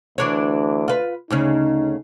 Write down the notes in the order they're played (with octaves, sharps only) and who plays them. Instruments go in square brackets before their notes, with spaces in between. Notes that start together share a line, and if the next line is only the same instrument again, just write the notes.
[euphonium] D2 [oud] E3 D4 C#5
[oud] F4 B4
[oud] D2 C#3 C#4 [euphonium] D#4